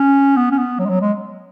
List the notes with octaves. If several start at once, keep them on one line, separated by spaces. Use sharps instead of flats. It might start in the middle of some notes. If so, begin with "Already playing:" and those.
Already playing: C#4
B3
C#4
B3
F#3
G#3
F#3
G#3